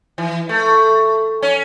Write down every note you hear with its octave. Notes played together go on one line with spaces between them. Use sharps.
E3
A3
C#4